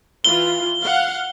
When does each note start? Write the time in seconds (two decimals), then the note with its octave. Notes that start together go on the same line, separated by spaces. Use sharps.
0.24 E3 F4 G7
0.83 F5 F#5